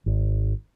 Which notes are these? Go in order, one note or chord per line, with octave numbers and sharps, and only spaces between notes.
G#1